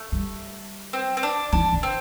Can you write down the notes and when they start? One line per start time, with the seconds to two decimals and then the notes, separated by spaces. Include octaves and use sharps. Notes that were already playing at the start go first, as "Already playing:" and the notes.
Already playing: A3
0.12 G3
0.93 C4
1.17 C4
1.23 D4
1.52 E3 D4
1.73 D3
1.83 C4